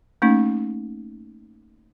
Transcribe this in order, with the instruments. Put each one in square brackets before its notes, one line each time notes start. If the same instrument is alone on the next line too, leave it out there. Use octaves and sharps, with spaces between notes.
[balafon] A3 A#3 C#4 D#4